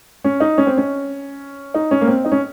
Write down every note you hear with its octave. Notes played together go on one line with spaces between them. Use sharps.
C#4
D#4
C#4
C4
C#4
D#4
C#4
A#3
C4
D#4
C#4